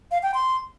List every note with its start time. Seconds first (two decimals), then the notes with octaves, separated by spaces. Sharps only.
0.11 F5
0.23 G5
0.34 C6